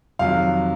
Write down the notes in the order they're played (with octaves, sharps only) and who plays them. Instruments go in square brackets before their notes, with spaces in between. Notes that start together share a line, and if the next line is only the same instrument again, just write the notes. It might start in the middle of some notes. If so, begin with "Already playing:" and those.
[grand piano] F2 C3 D#3 F#3 F4 F5